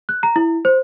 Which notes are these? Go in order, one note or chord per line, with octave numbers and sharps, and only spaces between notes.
F#6
A#5
E4
C5